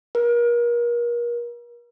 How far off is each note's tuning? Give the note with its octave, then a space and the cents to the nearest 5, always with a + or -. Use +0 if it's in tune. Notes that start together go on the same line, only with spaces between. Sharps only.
A#4 +35